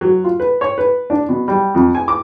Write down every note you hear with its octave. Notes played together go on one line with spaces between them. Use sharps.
F#3
F4
B4
C#5
B4
D4
B2
G3
F2
G#5
D6